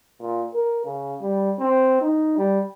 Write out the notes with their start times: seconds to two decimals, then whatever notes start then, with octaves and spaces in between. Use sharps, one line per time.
0.22 A#2
0.54 A#4
0.85 C#3
1.22 G3
1.59 C4
2.02 D#4
2.38 G3